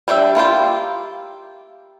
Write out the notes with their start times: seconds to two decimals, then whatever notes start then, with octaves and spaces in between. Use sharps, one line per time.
0.08 G3 D4 G4 E5
0.35 A#3 E4 F4 G4